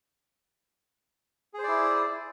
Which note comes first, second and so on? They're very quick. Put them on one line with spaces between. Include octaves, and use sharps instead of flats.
G#4 C5 D5 E4